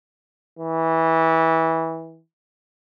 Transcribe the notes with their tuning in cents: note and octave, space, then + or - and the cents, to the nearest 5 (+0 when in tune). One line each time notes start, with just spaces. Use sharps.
E3 -20